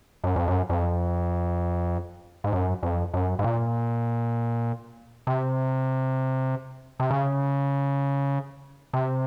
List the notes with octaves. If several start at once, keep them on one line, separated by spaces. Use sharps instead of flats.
F#2
F2
F#2
F2
G#2
F#2
F2
F#2
G#2
A#2
C3
C3
C#3
C3